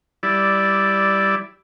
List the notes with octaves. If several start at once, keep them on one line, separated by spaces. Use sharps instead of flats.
G3 E4 D5